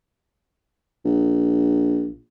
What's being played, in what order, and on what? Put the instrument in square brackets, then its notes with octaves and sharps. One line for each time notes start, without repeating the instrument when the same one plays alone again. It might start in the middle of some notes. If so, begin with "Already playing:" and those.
[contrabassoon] A#1